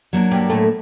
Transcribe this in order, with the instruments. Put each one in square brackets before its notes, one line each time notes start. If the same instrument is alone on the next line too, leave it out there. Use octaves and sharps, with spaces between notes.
[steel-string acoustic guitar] F#3 A#3 D4
[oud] G2 G3
A2 A3